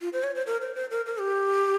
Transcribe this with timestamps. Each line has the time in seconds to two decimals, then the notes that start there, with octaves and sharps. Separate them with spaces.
0.01 F4
0.13 C5
0.23 C#5
0.35 C5
0.47 A#4
0.62 C5
0.75 C5
0.91 A#4
1.06 A#4
1.20 G4